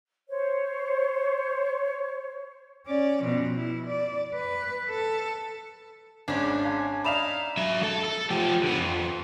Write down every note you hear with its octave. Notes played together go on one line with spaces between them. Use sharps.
C5 C#5
C#4 D5
B2 F3
E4
D5
B4
A4
G#1 G#2 C#4 D4
F5 G#5
D#4 D5 E5 F5 B5 E7 F7
F#3 E5
A4
A4
F3 G4
D3 B3
F2